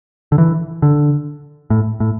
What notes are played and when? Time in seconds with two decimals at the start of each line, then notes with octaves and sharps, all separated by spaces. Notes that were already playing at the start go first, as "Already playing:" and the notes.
0.32 D3
0.38 E3
0.82 D3
1.70 A2
2.00 A2